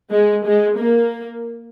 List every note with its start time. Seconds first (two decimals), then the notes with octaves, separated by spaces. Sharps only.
0.11 G#3
0.45 G#3
0.78 A#3